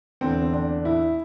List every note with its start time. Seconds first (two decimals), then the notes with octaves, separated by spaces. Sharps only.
0.21 E2 D3 C4
0.53 D4
0.85 E4